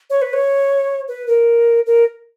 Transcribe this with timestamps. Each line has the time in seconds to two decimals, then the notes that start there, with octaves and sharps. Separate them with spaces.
0.10 C#5
0.22 B4
0.33 C#5
1.08 B4
1.27 A#4
1.86 A#4